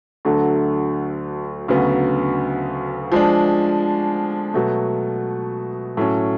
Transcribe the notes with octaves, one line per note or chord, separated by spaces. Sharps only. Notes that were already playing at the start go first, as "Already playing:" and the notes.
D2 D3 F#3 A3
D2 C#3 F#3 B3
F3 G#3 D4
B2 F#3 A3
A2 F#3 C#4